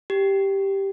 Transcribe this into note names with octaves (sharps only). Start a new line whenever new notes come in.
G4